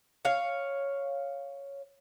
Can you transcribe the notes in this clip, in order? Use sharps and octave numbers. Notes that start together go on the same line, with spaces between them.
C#5 F5